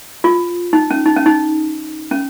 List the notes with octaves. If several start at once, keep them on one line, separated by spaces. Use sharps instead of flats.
F4
D#4
C#4
D#4
C#4
D#4
C#4